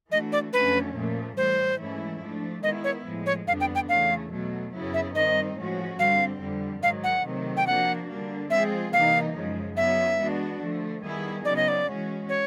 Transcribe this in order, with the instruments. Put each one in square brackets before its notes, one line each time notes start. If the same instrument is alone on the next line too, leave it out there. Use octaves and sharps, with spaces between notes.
[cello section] E3 A3 D4 F#4 [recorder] D#5
[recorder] D5
[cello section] F2 D3 F#3 A3 C#4 [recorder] B4
[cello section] A#2 F3 A3
[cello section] A2 E3 G3 [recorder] C5
[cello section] G#2 E3 A3 C#4 E4
F3 A3 D4
[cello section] D#3 G#3 B3 E4 [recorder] D#5
[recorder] C#5
[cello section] A2 F3 G#3
[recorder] C#5
[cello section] F2 D3 G3 B3 D4 [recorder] F5
[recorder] G5
G5
[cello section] E2 C#3 E3 A3 [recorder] F5
[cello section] B2 F#3 A3
F#2 C#3 F#3 B3 E4
[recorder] E5
[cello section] G2 D#3 G3 C4 D#4 [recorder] D#5
[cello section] A2 F3 G#3 C#4 F#4
[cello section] G2 D3 G3 C4 [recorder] F5
[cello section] F2 D3 G3
[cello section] G#2 D#3 F#3 [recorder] F5
[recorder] F#5
[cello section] C3 D#3 F#3 A3
[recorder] G5
[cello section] F3 A#3 D4 F#4 [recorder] F#5
[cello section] D3 G3 A#3 D4
[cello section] F3 G#3 C4 F4 G#4 [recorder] E5
[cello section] C3 E3 G3 A#3 D#4 [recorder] F5
[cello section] F#2 C#3 F3 G#3
[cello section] C#3 F#3 B3 D#4 [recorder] E5
[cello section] E3 G#3 B3 D4 F#4
D3 F3 A3
D#3 G3 B3 E4 G#4
[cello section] C#3 F#3 B3 D#4 [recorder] D5
[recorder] D#5
D5
[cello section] E3 G#3 C#4 F#4
[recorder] C#5